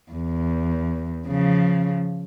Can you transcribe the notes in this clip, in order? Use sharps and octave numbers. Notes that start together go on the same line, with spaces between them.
E2
C#3 F3